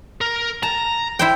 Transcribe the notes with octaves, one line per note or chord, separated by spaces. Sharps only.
A#4
A5 A#5
E4 C5 G5